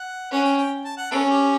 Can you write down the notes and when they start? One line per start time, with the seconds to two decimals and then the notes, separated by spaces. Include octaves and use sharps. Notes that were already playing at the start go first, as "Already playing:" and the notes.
Already playing: F#5
0.31 C#4 F#5
0.44 G5
0.58 G5
0.85 A5
0.97 F#5
1.11 C#4 A4
1.30 G4